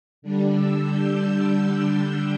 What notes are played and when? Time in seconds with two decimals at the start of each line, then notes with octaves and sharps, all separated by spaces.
0.22 D3 G3 D4
0.55 E6
0.87 G6
1.50 G6
1.82 G6